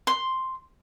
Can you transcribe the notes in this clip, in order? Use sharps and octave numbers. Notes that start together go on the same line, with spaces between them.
C6